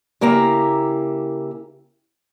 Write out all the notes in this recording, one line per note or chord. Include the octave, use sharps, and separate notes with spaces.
C#3 A#3 E4 G4 A#5